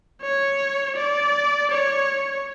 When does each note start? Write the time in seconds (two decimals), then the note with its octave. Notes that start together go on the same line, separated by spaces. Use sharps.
0.22 C#5
0.97 D5
1.72 C#5